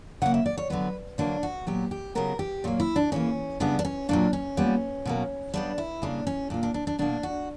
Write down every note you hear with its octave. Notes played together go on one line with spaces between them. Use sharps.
C#3 F#3 A#3 F#5
E5
D5
C#5
D3 F#3 B3 B4
D3 F#3 A#3 D4
F#4
A#2 F#3 B3 G4
G4
C#3 F#3 B3 A#4
G4
A#2 F#3 A#3
E4
D4
C#3 E3 A#3 C#4
C#3 G3 B3 D4
D4
C#4
A#2 F#3 A#3 D4
C#4
A#2 G3 B3
B2 F#3 A#3
C#3 G3 B3 D4
E4
C#3 G3 A#3 D4
C#4
A#2 A#3 D4
D4
D4
D4
B2 A#3 D4
F#4